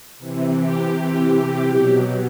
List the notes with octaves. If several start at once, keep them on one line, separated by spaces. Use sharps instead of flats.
C3 E3
G4
C3 E3
B2 F#3